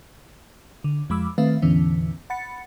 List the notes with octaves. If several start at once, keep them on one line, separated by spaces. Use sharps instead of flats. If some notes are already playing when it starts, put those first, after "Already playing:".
D3
F2 F3 G#3 B5 D6 E6
D#3 A3 C4 B4 E5 F5
E2 A2 D3 E3 B3 C#4
F#5 B5 A6 C#7